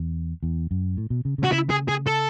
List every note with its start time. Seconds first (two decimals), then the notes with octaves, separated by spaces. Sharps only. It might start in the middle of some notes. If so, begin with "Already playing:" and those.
Already playing: E2
0.43 E2
0.71 F#2
0.97 A2
1.10 B2
1.25 C#3
1.38 C#3
1.44 F#4
1.52 C#3 E4
1.70 G#4
1.88 G#4
2.06 A4